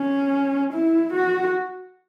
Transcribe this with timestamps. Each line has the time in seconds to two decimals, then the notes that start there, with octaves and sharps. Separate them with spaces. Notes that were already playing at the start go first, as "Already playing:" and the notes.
Already playing: C#4
0.73 E4
1.13 F#4